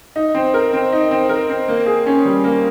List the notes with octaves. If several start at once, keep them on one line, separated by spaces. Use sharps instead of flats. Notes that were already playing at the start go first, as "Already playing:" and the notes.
D#4
C4
A#4
C4
D#4
C4
A#4
C4
A#3
G#4
C#4
G3
A#3